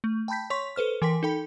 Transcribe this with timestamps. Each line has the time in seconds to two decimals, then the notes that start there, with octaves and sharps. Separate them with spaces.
0.04 A3
0.28 G5 A5 B5 G6 B6
0.50 C#5 C6 C#6 B6
0.76 A4 B4 C5 F6
1.02 E3 A#4 G5 C6 B6
1.23 D#4 A4 G5 B5